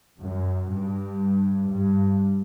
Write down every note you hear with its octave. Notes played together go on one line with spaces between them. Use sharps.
F#2
G2
G2